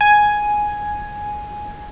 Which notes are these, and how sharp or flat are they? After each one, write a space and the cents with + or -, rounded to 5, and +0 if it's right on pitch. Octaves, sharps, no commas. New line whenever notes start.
G#5 +5